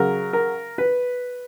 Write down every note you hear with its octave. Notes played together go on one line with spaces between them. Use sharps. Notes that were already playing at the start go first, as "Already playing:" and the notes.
Already playing: C#3 F#3 A#4
A#4
B4